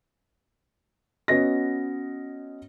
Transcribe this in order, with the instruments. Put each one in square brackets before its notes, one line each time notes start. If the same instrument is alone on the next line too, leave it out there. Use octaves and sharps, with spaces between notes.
[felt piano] B3 C#4 F#4 D#5 A#6